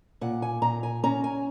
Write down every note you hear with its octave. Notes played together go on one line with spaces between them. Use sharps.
A#2 F#5
G#5
A#2 A#5
G#5
C#4 A#5
G#5